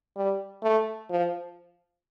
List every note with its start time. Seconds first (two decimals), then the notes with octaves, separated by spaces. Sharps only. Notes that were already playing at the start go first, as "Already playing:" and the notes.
0.17 G3
0.63 A3
1.10 F3